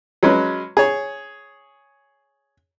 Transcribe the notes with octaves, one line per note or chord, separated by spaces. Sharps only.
F#3 G#3 C#4 B4
G#4 C#5